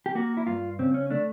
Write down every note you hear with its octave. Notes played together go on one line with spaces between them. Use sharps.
G4
A#3 F#4
E4
G2 F4
C#3 C4
C#4
A3 D4